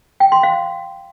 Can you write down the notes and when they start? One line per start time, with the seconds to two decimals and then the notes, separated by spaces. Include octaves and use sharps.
0.20 G5
0.32 C6
0.43 F5